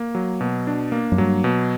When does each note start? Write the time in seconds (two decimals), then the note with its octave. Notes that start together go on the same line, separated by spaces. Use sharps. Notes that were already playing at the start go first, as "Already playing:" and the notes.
Already playing: A#3
0.15 F#3
0.41 B2
0.67 D4
0.92 A#3
1.12 F#2
1.18 G2 F#3
1.44 B2